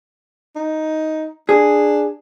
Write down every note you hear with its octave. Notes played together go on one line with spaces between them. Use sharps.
D#4
D4 G#4